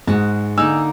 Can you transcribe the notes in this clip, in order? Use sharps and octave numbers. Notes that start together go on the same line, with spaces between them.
G#2 G#3 F#4
D3 A#3 D#4 G#5 E6